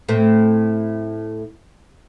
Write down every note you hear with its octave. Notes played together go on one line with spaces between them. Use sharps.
A2 A3 C4